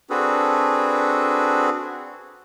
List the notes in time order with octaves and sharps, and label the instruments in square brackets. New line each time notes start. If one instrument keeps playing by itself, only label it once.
[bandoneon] C4 D4 F#4 G#4 A4 B4